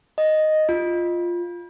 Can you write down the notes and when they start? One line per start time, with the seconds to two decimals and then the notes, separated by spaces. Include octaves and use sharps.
0.18 D#5
0.69 F4